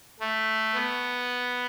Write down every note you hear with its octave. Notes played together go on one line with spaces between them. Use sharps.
A3
B3